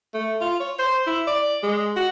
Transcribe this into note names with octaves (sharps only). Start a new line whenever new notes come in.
A3
F4
C#5
C5
E4
D5
G#3
F#4